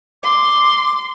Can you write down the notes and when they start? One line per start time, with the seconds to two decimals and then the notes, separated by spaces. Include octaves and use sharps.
0.24 C6 D6